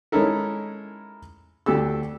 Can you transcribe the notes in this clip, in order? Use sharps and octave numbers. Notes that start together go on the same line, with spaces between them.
G#3 C#4 D#4 E4 A4 A#4
D2 G4 A4 E6